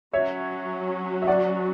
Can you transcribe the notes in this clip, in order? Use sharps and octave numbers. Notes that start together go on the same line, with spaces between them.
F#3 C#4 F#4 C#5 E5
E5
D5 F#5